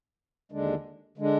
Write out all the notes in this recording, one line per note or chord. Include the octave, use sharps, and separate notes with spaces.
D#2 D3 G#3 D4
D3 G#3 D4